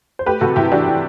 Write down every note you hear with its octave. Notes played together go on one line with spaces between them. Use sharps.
C5
A3 G4 B4
C3 F#4 A4
C3 E4 G4
E3 D4 F#4
E3